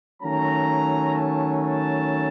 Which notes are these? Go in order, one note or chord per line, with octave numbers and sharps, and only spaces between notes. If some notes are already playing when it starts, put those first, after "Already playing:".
D#3 F#3 A3 C#4 A#5
A5
A5